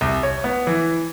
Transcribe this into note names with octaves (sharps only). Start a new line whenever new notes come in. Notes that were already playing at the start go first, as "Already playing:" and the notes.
C2
C#5
B3
E3